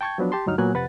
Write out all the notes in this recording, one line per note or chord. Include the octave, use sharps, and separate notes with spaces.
G5 A5 C#6 G6 G#6
F3 F#3 B3 D4
G4 A5 C6
D2 G2 F#3 D#4 F6
A#2 F#3 A#3 B3 G#5 F#6
F2 C3 B4 F#5 A6